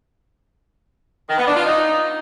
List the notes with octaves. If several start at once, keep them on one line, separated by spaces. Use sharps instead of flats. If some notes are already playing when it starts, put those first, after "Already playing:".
D#3
B3
D4
F4
D#4